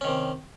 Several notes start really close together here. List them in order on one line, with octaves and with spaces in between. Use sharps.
C#4 D#3 C3